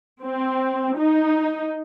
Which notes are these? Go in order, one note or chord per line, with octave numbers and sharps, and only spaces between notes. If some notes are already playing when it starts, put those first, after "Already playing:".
C4
D#4